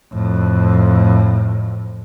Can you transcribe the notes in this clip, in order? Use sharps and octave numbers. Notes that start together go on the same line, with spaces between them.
F2 A2